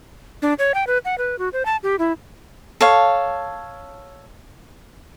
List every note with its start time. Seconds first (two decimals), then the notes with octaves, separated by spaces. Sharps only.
0.42 D4
0.59 C#5
0.74 G5
0.87 B4
1.05 F#5
1.18 B4
1.39 F#4
1.53 C5
1.65 A5
1.83 G4
1.99 E4
2.81 A4 C#5 F5